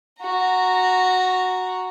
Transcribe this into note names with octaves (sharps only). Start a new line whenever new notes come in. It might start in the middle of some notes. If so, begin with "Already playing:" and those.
F#4 A#5